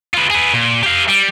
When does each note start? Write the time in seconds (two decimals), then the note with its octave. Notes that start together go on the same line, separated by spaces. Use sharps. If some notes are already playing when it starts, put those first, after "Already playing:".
0.14 F4 B4
0.30 G#4 B4
0.54 A#2
0.83 G4 F5
1.09 G3